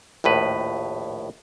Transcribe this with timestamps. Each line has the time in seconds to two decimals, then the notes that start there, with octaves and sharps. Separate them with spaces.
0.24 A#1 D#2 A2 B4